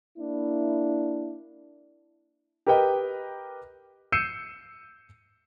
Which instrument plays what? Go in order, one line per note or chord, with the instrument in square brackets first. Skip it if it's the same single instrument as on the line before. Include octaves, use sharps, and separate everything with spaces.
[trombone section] A#3 D4 E4
[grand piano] G4 A#4 B4 D#5 G5
E6 G6 C7 C#7 D#7 E7